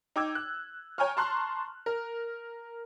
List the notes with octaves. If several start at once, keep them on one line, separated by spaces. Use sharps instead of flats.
D#4 G5 D6 E6 G#6
F#6
C#5 G5 G#5 A#5 C#6 F6
A5 A#5 C6 C#6 F#6
A#4